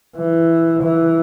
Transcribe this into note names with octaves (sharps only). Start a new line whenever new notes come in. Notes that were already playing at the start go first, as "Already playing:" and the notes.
E3
E3